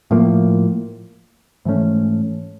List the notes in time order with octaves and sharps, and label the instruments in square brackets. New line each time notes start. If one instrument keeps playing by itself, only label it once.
[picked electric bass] A2 F3 A#3
G#2 E3 A3 C#4